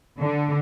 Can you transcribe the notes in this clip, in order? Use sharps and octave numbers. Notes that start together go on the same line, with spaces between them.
D3